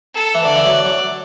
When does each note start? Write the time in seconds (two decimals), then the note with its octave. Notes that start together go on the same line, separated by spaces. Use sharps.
0.14 A4
0.35 E3
0.45 D3 D5
0.55 E3
0.66 F#3
0.85 F#3